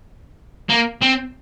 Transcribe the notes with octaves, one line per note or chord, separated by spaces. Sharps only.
A#3
C4